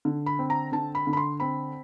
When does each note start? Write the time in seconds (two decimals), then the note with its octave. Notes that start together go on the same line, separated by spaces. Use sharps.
0.05 D3
0.26 B5
0.39 C4
0.50 A#5
0.72 D3 A5
0.95 B5
1.07 D3
1.13 B5
1.17 C6
1.40 C4 B5